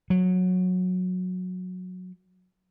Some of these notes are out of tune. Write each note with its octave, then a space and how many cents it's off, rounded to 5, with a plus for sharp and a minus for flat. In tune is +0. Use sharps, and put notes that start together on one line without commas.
F#3 -15